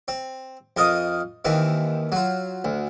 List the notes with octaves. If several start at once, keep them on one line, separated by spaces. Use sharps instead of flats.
C4
F2 A#4 D#5 F5 D#6
D#2 D#3 E3 C4
F#3 F4
D2